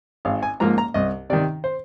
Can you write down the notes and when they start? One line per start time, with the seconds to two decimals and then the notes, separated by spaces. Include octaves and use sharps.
0.25 G#1 F5
0.43 G#5
0.60 G#2 F3 A#3 A#5
0.78 A#5
0.94 C2 D#5
1.30 C3 D#3 D5
1.64 C5